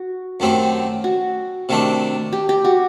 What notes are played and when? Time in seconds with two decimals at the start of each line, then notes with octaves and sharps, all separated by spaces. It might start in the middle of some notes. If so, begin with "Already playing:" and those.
Already playing: F#4
0.40 F#2 D#3 A3 C4 G4
1.04 F#4
1.69 C3 D#3 A3 D4
2.33 G4
2.49 G4
2.65 F#4